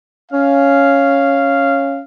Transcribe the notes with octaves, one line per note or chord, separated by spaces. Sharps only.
C#4 F5